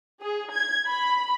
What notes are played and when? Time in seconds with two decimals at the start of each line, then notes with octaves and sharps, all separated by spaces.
0.21 G#4
0.51 G#6
0.87 B5